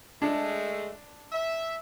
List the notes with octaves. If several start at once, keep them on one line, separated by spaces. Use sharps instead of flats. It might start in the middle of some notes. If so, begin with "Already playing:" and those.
G#3 A3 D4
E5